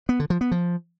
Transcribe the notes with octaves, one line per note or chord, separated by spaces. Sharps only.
B3
D3
F3
B3
F3